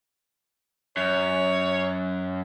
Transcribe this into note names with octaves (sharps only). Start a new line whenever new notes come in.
F#2 C#5